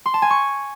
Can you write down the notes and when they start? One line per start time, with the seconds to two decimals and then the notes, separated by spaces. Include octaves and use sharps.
0.06 C6
0.14 A5
0.22 G#5
0.30 C#6